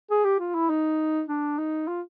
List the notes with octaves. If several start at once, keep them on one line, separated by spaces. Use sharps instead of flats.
G#4
G4
F4
E4
D#4
D4
D#4
F4